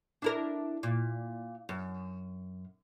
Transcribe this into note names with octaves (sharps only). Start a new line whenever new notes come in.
D4 E4 A#4
A#2
F#2